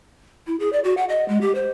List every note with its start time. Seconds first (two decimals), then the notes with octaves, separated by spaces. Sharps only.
0.47 E4
0.60 G#4
0.73 D5
0.84 F#4
0.97 F#5
1.09 D#5
1.28 G#3
1.41 G4
1.55 C5